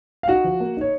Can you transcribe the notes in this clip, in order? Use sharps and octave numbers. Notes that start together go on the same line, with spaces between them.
F5
D#4 F#4 F#5
F3
A#3
D#4 C#5